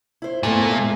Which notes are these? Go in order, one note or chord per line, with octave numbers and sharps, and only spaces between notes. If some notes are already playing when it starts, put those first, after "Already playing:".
E4 C5
A#2 A3 B3 A4
G#3 E5